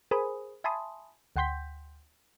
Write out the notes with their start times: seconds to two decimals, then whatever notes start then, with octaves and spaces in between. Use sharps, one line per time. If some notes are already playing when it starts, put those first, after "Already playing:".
0.11 G#4 A#4 C5 G#5 B5 D#6
0.64 E5 G#5 A5 B5 C6 D#6
1.36 D2 F#5 G5 C6 G6 B6